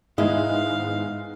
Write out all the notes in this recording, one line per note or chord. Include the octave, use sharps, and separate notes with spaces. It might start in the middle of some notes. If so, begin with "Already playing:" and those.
G#2 D#3 G#3 B3 E4 D#5 F5